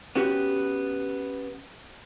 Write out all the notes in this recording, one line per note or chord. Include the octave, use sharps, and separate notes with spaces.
B3 C#4 F#4 G4